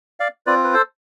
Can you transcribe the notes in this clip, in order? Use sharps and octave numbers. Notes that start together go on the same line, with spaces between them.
D5 F5
C4 F4 B4 D5
B4
A4 C5